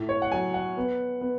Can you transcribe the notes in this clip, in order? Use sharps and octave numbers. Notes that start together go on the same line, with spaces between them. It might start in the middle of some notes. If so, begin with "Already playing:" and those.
Already playing: A2
C#5
F#5
F#3 G#5
F#5
B3
B3